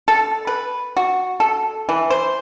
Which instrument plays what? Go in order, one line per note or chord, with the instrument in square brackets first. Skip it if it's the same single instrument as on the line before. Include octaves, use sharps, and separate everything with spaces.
[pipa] A4
B4
F#4
A4
E3
C5